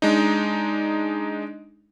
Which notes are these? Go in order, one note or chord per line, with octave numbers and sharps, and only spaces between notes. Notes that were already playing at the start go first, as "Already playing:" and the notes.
G#3 D4 D#4